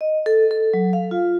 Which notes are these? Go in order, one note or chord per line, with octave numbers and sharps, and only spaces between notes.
D#5
A4
A4
F#3
F5
F4